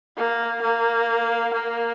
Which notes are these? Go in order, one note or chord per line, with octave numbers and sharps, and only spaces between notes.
A#3
A#3
A#3